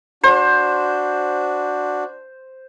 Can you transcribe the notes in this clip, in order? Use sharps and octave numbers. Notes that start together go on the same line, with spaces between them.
D4 F#4 C5